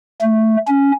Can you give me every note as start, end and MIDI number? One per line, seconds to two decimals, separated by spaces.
0.22 0.57 57
0.68 0.92 61